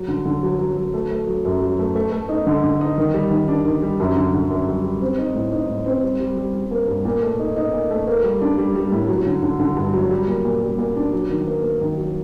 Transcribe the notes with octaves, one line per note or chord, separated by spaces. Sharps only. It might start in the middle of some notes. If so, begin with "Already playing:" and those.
Already playing: F#3
D3
D3
F#3
F#3
F#3
A3
A3
F#3
F#2
F#3
A3
A3
A3
D#4
D3
D3
D#4
D#3
G3
D#3
D4
D#3
G3
F#2
D3
D3
F#2
G3
G3
C4
D#4
A2
D#4
A2
C4
G3
G3
G3
G3
A#3
G2
A#2
A3
D#4
D#4
A#2
A3
A#3
G3
D4
G3
G3
A2
F#3
D3
D3
D3
G2
F#3
G3
A#2
A#2
G3
A#2
D4
F#3
D#3
A#3
A#3
D#3
F#3